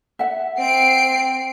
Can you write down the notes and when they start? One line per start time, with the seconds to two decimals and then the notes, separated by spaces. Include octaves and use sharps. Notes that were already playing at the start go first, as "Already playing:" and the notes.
0.19 E5 F#5
0.59 C4 C7 D7